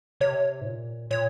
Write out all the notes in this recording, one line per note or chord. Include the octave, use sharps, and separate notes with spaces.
C3 C#5
G#2
A#2
A#2 C#5